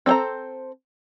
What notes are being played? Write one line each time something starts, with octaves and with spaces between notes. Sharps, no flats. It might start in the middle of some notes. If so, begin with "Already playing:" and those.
C4 D4 A4 C5 A#5